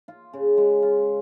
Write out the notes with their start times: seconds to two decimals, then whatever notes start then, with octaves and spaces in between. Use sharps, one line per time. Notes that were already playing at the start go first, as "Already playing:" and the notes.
0.08 F4
0.33 C#3
0.57 G#3
0.82 F4